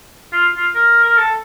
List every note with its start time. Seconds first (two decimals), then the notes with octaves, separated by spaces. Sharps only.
0.32 F4
0.57 F4
0.75 A#4
1.04 A#4
1.18 A4